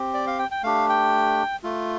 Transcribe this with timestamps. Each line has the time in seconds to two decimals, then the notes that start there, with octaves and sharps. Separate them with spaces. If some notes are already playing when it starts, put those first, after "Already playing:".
Already playing: C4 G4
0.14 D5
0.27 F5
0.39 G5
0.51 G5
0.63 A3 D4 G4 F5
0.89 G5
1.63 A3 F4